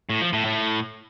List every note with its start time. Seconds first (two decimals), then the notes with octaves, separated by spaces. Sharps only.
0.10 A2
0.21 F3
0.33 A2
0.45 A2